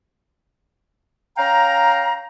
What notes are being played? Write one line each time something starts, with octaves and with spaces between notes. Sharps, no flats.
C#4 F5 G5 A#5